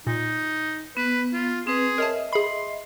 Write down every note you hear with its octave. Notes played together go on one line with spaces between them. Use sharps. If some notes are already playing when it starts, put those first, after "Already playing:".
A#2 D#4
B3 B4
F4
C4 G#4 B4
A#4 C#5 D#5 E5 A5
G#4 B5 C6